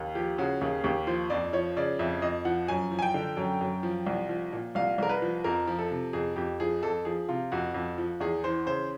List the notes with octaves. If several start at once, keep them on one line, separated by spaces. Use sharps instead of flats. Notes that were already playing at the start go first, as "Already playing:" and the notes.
Already playing: D#2
F3 G4
C#3 F#4
D#2 G#4
D#2 G4
F3 C5
F2 D5
F3 C#5
C#3 D5
F2 E5
F2 D#5
F3 F#5
F#2 G#5
F3
G#5
G5
D3
F#2
F#2
F3
C2
F3
A#2
C2 F5
C2 A#4
B4
F3
F2 A#4
F3
A4
C3
F2 G#4
F2 G4
F3 G#4
F2 A4
F3 G#4
C3 F4
F2 F#4
F2
F3
E2 G#4
E3 C5
C#3 C5